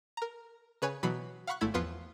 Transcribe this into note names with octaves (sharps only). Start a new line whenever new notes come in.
A#4 A#5
C#3 B4 C#5 G#5
B2 E3 F#3 B5 C7
F5 F#5 B5 C#6 F#6
G#1 G#2 A3 E4 B5 G#6
E2 F3 B3 F4 B4 C7